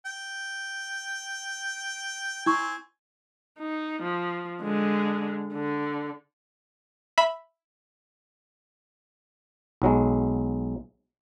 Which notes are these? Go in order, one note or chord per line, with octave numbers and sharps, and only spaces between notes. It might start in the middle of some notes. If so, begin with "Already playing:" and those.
G5
C4 E4 G#5 C#6
D#4
F3
D3 G#3
D3
E5 B5
B1 F#3 G#3